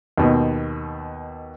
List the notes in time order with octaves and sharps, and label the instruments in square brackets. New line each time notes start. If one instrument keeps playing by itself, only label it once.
[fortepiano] D#2 B2